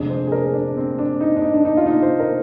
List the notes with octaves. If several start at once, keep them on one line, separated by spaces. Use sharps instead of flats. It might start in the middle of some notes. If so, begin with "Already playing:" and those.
Already playing: F1 F2 D3 G#3 D4
C5
G#4
A#4
D4
C4
D4
D#4
D4
D#4
D4
D#4
F4
D#4
C5
A#4